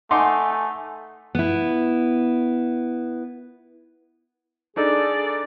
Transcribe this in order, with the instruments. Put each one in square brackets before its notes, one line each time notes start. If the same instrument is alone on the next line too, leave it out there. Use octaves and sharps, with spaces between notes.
[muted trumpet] A3 [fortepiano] D#4 C6 D6 [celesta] F#5 [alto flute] G#5
[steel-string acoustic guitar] B3 E4
[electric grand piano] D4 D#4 A4 [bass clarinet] G#4 [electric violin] D5